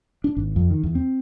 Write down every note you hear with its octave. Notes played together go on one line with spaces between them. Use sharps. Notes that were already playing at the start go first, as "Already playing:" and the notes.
D4
G#1
F2
D#3
E2
C4